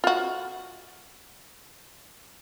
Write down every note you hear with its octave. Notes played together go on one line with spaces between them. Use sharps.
F4 F#4